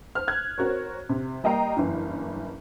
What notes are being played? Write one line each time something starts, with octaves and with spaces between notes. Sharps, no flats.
C5 F6
F#6 G#6
C4 F#4 A#4 C#5
C3
G3 A#3 D#5 G5 A#5 C7
F#1 G2 E3